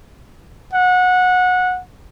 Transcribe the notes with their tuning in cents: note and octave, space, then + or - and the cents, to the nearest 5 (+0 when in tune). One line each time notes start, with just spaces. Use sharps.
F#5 -20